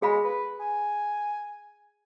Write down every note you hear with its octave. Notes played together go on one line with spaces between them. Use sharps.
G#3 G#4 F5 B5
B4
G#5